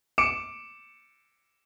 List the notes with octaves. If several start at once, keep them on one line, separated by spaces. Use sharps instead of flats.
D6 C#7 D7 E7